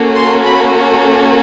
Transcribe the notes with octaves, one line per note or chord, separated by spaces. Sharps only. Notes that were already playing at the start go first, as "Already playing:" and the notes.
Already playing: A#3 C#4 F#4 A4
C6
B5